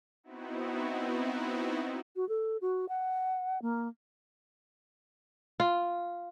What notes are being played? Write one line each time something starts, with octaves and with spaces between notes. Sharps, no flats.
B3 C4 D#4 E4 F#4
F#4
A4
F#4
F#5
A#3
F4